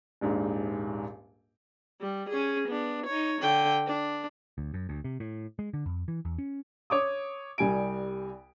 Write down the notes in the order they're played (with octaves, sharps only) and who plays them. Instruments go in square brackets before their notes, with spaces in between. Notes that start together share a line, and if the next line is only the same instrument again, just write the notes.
[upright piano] D#1 A#1 G#2
[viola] G3
C#4 G#4
B3 D4
D#4 C#5
D3 G5
D4
[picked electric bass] D2
F#2
D2
C3
A2
G#3
D3
F2
E3
E2
C#4
[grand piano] C#5 D6 D#6
C2 G3 G#5 D7